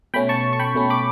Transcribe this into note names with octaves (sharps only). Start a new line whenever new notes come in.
B2 A3 C#4 G5 B5
A5 C#6
C#6
G5 B5
B2 A3 C#4
B5 D6